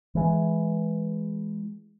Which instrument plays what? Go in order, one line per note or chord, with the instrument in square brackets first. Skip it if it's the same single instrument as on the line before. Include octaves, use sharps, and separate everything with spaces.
[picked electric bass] E3 G#3